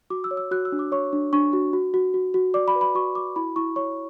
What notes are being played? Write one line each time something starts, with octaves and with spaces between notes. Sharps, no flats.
F#4 D6
E6
C#5
E6
F#4 F#6
E6
D4
D6
C#5 C#6
D4
D4 C#6
F#4
F#4
F#4
F#4
F#4
D5 D6
B5
B4
B5
F#4 C#6
F#4 D6
E4 B5
E4 C#6
C#5 C#6